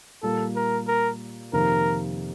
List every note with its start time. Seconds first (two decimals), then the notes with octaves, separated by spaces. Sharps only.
0.22 A#2 G3 A#3 A4
0.56 A#4
0.87 A#4
1.53 F2 C3 D#3 A#3 A#4